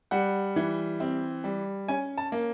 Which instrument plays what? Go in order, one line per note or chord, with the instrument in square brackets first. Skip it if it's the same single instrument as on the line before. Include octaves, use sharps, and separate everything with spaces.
[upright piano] G3 F#5
E3
C4
G3
C#4 G#5
A5
A#3